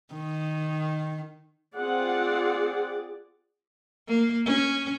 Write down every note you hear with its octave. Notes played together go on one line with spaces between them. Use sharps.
D#3
C4 F4 G#4 D5 F#5
A#3
C#4